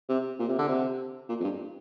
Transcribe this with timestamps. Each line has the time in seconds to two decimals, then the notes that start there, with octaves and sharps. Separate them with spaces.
0.09 C3
0.39 A#2
0.49 C3
0.58 D3
0.68 C3
1.29 A#2
1.39 F2
1.44 G2